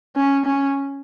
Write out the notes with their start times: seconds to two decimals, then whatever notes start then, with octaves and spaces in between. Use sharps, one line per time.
0.16 C#4
0.46 C#4